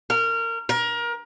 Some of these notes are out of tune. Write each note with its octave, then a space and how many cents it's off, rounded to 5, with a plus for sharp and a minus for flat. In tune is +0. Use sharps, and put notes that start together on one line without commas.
A#4 -25
A#4 +25